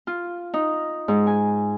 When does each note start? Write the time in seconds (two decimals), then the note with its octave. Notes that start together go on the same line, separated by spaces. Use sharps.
0.07 F4
0.54 D#4
1.08 G#2
1.27 G#5